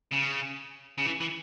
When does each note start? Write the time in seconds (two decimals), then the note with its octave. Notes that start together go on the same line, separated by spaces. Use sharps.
0.12 C#3
0.98 C#3
1.05 E3
1.20 E3